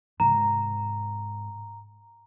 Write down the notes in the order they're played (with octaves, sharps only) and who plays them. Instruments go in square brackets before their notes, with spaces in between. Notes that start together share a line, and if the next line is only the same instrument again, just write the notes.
[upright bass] G#2 C3 [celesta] A#5